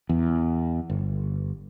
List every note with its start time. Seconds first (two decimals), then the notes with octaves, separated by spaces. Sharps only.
0.09 E2
0.90 G1